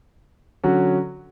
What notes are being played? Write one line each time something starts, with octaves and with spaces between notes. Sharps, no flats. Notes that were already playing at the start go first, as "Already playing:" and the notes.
D3 F#3 C#4 F#4